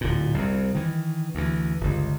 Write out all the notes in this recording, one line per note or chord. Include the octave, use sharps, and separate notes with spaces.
D1 A#2
C2 F2
D#3 E3
D2 E3
G1 C#2